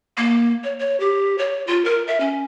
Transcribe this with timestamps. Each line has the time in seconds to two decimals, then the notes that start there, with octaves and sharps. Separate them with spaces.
0.17 A#3
0.64 C#5
0.79 C#5
1.00 G4
1.38 C#5
1.67 F4
1.85 A#4
2.07 E5
2.20 C#4